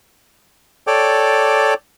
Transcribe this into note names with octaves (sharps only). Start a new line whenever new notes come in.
A4 C#5 D5 G5 D6